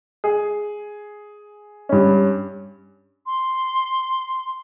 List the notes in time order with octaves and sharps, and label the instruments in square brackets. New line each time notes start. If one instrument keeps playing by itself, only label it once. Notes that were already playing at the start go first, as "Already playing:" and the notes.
[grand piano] G#4
G2 C#4
[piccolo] C6